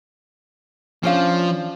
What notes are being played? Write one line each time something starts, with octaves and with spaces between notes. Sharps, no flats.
F3 C#4 D4 F5